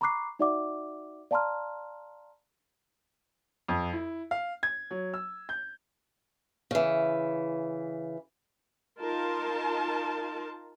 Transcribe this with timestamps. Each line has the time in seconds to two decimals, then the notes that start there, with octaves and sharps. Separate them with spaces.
0.01 A#5 B5 C#6 D6 F#6 C7
0.39 D#4 F#4 D5 E5 F#5 D6
1.31 D5 F5 A5 A#5 C6 F6
3.68 F2
3.93 E4
4.31 F5
4.63 G#6
4.91 F#3
5.14 E6
5.49 G6
6.71 C#3 E3
9.01 D#4 F4 A#4 A5 C6